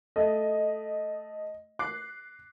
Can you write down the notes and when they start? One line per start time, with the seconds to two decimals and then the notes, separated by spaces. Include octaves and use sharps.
0.16 A3 D#5
1.79 D6 F#6 C7